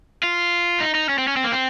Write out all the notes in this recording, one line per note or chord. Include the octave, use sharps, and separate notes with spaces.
F4
D#4
D#4
C#4
C4
C#4
C4
A#3
C4